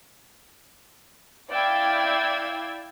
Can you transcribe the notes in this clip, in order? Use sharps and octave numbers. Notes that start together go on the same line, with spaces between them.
E4 D5 F5 G5 E6 G#6